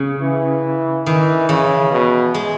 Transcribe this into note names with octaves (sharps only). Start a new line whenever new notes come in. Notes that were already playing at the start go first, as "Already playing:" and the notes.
Already playing: C#3
E3
D#3 E3
C#3 E3
B2
G#3